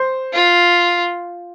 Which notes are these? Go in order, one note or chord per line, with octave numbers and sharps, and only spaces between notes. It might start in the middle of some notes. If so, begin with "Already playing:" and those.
Already playing: C5
F4